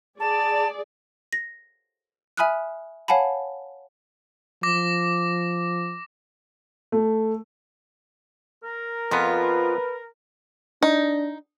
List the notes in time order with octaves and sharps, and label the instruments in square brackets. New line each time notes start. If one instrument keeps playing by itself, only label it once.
[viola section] G#4 D5 [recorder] A5
[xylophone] A#6
E5 G#5 B5 D#6 F6 F#6
C#5 F5 F#5 G#5 A5 B5
[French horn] F3 [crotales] D6 A#6
[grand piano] A3
[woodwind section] A#4
[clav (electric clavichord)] F2 B3 [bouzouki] F3 F4 [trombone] B4
[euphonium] D4 [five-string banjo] D#4